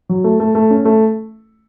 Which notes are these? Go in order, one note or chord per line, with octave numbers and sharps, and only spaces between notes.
F#3
A3
A3
A3
C#4
A3